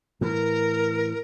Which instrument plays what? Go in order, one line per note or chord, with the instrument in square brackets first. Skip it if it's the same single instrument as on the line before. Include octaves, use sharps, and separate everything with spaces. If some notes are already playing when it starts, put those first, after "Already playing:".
[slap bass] A2 E3 [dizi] A#4